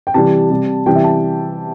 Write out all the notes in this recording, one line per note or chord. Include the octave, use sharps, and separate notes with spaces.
G5
C3 E3 G3 A5
C3 G3
C3 E3 G3 G5
E5
A5